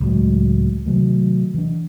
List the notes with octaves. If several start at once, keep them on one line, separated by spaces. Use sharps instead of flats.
C#2 A2 F#3 G#3
C3 D#3 F#3 A3
E3 D4